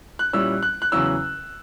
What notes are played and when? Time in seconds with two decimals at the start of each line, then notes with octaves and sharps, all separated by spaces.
0.19 F#6
0.33 A#2 G3 C#4 E4 E6
0.62 F#6
0.82 F#6
0.92 E2 C#3 F#3 C#4 E6